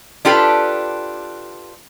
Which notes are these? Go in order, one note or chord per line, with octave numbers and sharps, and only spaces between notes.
D4 F4 G4 A4 B4